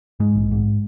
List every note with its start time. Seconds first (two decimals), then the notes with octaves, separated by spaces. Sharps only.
0.20 G#2 G#3
0.35 A#1
0.51 G#2